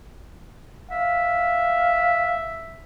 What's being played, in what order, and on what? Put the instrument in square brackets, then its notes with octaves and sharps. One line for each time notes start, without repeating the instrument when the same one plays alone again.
[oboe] E5 [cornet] F5